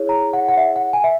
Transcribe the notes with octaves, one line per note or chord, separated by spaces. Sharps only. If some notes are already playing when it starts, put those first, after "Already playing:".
Already playing: E4 G#4 C#5
A#5
F#5
F#5
E5
F#5
G#5
E5